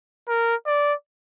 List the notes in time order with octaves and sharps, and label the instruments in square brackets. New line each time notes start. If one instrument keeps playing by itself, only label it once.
[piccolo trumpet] A#4
D5